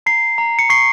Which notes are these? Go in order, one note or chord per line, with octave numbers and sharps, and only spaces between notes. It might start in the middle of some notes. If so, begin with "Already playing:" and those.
A#5 C7
A#5
C#7
C#6 C7